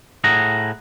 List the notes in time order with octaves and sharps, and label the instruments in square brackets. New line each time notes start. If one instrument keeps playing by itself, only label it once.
[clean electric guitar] A2 G#4 F#5 A#5